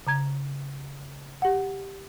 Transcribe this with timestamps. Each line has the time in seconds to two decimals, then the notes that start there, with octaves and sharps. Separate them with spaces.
0.07 C#3 A#5 G#6
1.42 G4 F#5